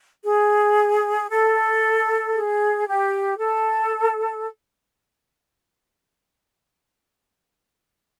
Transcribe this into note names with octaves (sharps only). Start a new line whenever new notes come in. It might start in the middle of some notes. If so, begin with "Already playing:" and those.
G#4
A4
G#4
G4
A4